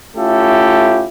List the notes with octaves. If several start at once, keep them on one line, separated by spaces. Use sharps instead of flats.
A3 C#4 E4 F4 G4 A4